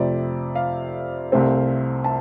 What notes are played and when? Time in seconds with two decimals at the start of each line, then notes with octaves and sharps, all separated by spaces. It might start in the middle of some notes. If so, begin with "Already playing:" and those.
Already playing: F2 C3 A3 C4 D5
0.55 F5
1.32 C2 C3 A3 C4
2.04 A5